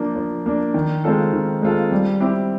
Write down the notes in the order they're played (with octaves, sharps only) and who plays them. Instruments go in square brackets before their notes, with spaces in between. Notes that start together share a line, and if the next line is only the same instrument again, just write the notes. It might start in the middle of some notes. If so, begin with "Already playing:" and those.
Already playing: [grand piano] F3 A#3 D4
F3
A#3 D4
D#3
G#3 C4 F4 A4
D#3
G#3 C4 F4 A4
G3
C4 E4 G4